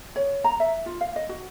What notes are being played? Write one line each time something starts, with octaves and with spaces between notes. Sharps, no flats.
C#5
A#5
E5
F4
F5
D#5
F#4